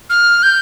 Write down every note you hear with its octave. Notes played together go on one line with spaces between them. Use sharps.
F6
G6